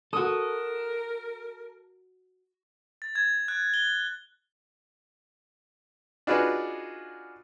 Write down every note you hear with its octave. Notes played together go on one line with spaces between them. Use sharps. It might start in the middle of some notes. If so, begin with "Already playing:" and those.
F#4 A4 A#4 D#6
A6
G#6
F#6
G7
D4 D#4 F4 F#4 G#4 B4